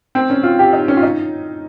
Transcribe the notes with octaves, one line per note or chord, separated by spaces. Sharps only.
C4
C#4
F4
G4
D#4
C#4
F4
D#4